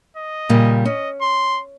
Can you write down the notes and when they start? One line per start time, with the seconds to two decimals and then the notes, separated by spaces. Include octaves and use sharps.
0.17 D#5
0.49 A#2 C#3 G3
0.85 C#4 D#5
1.22 C6